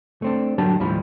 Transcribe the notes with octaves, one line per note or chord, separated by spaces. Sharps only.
A3 C4 D4
D3 F#3 G3 D4 A5
D#2 A2 F3 G3 B5